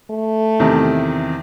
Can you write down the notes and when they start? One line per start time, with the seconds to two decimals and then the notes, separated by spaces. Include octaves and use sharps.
0.10 A3
0.60 E2 C3 D#3